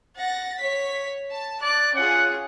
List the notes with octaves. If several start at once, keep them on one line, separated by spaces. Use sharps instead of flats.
F#5 A6 A#6
C#5 B6
A5
D5 F#6
C#4 F4 G#4 F#5